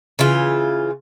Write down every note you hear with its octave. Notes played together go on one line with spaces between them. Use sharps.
C#3 E3 F4